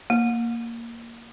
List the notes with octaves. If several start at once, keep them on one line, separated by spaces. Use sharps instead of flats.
A#3